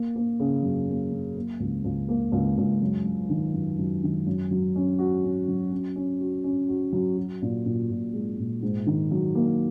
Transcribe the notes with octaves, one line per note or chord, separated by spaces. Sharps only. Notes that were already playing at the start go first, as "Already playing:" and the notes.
Already playing: A#3
A#3
C#3
F#2
A#3
F#2
A#3
C#2
C#2
A#3
C#2
C#2
F#2
F#2
D#3
F#2
F#2
D#3
F#2
F#3
C#4
F#4
C#4
F#3
C#4
C#4
F#4
C#4
F#4
F#3
F#4
A#2
A#2
A#2
G#3
A#2
G#2
D#3
F#3
A#3